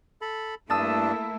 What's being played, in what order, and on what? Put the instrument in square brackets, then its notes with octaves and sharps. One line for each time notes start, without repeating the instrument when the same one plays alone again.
[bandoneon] A4 B5
[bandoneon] G2 D4 [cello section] A3 A#3 E4 [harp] A5 D#6 E6